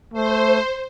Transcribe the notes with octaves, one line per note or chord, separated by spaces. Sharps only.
A3 C5